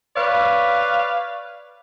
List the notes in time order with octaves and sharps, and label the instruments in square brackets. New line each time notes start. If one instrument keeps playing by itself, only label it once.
[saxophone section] B4 C#5 D5 F5